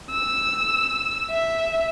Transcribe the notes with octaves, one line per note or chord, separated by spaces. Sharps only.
E6
E5